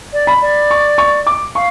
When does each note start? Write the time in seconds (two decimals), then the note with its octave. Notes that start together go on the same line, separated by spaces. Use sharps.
0.13 D5
0.27 B5
0.41 D5
0.71 C#6
0.98 C#6
1.27 D6
1.55 F5 C#6